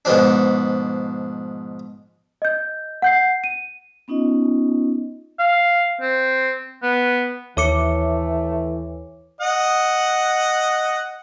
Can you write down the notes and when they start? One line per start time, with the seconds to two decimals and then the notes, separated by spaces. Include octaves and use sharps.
0.05 G#2 B2 F3 D4
2.42 D#5 G6
3.02 F#5 G6 C7
3.44 D#7
4.08 B3 C#4 D#4 F4 D#5
5.39 F5
6.01 C4
6.83 B3
7.57 D#2 E3 A3 C#5 D6 C#7
9.41 D#5 F#5